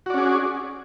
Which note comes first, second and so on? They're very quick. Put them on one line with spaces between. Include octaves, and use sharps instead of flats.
F#4 D5 C#4 G#4